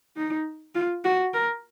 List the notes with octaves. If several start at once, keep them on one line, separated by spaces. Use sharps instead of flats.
D#4
F4
F#4
A#4